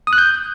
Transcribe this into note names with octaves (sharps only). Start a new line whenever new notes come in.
D#6
F#6
G6